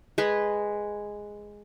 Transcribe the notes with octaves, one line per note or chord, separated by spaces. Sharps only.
G#3 G#4 B4